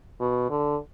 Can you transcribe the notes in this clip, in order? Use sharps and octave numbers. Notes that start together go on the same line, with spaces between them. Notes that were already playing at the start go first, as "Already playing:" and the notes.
B2
D3